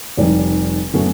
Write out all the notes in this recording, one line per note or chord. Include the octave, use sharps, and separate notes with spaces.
F1 D#3 G3 D5
F#2 F#3 A3 B3 C#4